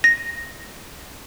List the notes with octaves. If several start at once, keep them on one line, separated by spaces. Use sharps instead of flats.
A#6